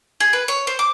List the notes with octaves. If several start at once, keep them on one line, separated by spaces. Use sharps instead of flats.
G#4
B4
C#5
C5
D6